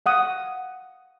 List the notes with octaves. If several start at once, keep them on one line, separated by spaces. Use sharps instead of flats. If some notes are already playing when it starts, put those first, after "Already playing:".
F5 F#5 D#6